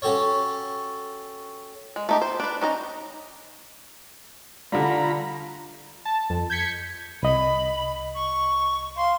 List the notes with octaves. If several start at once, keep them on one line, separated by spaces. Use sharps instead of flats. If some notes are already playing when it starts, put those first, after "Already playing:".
C#4 F#4 G4 A4 C#5
G#3
A3 D#4 G4
C5
D4 B4
C#4 D#4 D#5 A#5
D3 G3 F4 A#5 B5
A5
F2
G6 G#6 B6 C#7
C2 D#5 B5
C#6
F5 C6